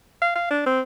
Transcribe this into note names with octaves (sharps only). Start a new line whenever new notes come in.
F5
F5
D4
C4